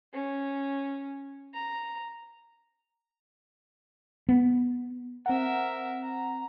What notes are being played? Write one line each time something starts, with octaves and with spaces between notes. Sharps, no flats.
C#4
A#5
B3
C4 A#4 E5 F#5
A#5